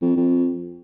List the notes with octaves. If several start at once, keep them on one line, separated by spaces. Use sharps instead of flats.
F2
F2